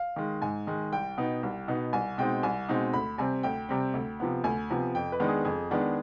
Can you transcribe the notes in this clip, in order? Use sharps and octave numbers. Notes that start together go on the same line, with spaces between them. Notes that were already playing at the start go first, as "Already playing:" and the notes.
Already playing: F5
D#3 G#3
G#2 G#5
D#3 G#3
C2 G5
B2 B3 D#4
C2
B2 B3 D#4
C2 G#5
B2 G#3 C4 D#4 G5
C2 G#5
B2 G#3 C4 D#4
D2 B5
C3 G3 C4 G#5
D2 G5
C3 G3 C4
D2
C3 F3 B3
D2 G#5
C3 F3 B3
F2 G5
B4
D#3 G#3 B3 D4
G#4
F2 G#4
D#3 G#3 B3 D4